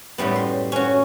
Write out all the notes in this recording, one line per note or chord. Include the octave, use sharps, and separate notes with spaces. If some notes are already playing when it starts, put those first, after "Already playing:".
F#2 A2 G3 B3
C6
C#4 F#4